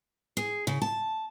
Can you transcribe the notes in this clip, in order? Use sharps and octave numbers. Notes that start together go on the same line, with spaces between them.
G#4
C#3
A5